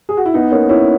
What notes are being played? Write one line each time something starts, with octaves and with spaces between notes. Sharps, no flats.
G#4
F#4
E4
B3 D#4
A#3 C#4
C#4 E4